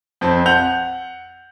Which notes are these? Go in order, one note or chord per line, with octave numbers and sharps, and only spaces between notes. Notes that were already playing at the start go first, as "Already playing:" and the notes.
F2 C4
F#5 G6 F7